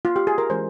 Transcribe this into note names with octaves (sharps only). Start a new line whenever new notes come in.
F4
G4
G#4
A#4
E3 G#3 C#4 C5